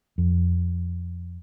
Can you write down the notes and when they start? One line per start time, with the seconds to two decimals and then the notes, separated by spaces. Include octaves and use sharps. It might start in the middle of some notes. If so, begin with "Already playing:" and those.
0.18 F2